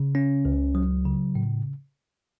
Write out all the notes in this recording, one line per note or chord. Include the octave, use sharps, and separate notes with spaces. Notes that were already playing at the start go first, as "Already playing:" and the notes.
Already playing: C#3
C#4
C#2
F#3
C#3
A2